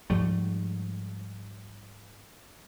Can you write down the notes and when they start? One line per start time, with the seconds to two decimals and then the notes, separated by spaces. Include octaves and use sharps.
0.10 G#2 F3 G3 A3